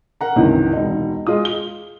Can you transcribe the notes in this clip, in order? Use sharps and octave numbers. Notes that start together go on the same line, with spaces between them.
A#4 F#5 A#5
C#2 G2 C3 D#3 E3
E1 D#4
G#3 F4 D#6
G7